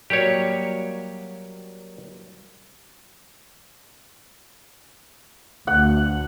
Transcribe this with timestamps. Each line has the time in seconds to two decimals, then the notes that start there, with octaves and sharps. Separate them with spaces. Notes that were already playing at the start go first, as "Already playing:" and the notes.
0.10 F#3 G3 A#3 G4 C#5
5.67 D2 F#5